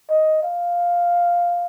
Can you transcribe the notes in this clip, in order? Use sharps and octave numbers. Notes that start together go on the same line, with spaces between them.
D#5
F5